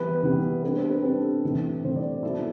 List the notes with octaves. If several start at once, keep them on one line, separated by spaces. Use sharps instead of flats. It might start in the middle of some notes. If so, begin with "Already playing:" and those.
Already playing: E3 G3 B3 B4
E3 G3 B3
C3 G3 D4 B4
C5
B4
C3 G3 D4 A4
A2 E3 G3 C4
A2 E3 G3 C4 C5
D5
F#3 B3 E4 A4